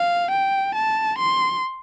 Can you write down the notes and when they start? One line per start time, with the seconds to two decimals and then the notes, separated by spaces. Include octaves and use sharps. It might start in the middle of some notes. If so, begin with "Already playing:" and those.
Already playing: F5
0.31 G5
0.75 A5
1.18 C6